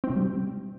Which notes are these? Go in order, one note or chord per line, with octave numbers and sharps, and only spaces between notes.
C4
C3
G3